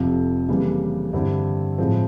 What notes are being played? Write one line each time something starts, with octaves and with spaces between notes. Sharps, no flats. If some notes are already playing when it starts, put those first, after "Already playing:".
Already playing: F1 F2 C3 F3
F2 C#3 E3 G3 A#3
G2 D3 G3 C4 E4
A2 F3 G#3 C4